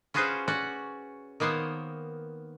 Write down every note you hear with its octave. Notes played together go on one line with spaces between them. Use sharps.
C#4 F4 F#4 G#4 B4 C5
C#4 F#4 D5 F#5
D#3 A#3 B3 C5 C#5